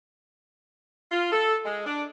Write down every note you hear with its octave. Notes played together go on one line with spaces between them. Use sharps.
F4
A4
G#3
D4